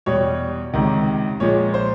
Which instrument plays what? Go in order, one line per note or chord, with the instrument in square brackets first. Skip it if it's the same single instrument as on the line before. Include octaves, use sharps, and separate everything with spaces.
[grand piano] E2 B2 G3 C#5
C#2 C3 D#3
A#2 F3 G#3 C#5
C5